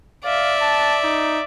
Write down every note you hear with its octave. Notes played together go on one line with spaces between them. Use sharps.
D5 E5 F5
A5
D#4